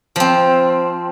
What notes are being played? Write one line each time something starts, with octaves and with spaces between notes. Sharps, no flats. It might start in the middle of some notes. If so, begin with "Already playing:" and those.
F3 C4